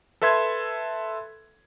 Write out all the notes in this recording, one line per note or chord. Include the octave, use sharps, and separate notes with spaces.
A4 B4 E5 C6 G#6